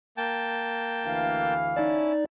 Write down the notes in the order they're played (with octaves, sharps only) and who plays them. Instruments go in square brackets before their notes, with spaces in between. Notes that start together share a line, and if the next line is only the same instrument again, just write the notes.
[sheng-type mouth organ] A#3 G5 A5
[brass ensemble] D2 E3 F5
[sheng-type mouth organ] C#4 E4 A5 [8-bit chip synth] D#4 D5